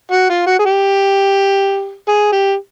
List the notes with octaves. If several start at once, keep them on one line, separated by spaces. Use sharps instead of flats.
F#4
F4
F#4
G#4
G4
G#4
G4